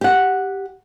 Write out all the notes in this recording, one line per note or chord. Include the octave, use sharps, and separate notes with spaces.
G4 F#5